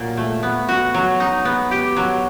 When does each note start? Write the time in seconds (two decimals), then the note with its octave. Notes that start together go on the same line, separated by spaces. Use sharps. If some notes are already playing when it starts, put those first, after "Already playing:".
Already playing: A#2 F#3
0.17 A3
0.43 B3
0.68 F#4
0.94 F#3
1.20 D#4
1.45 B3
1.71 G4
1.96 F#3